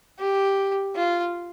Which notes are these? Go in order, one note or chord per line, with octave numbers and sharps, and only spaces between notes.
G4
F4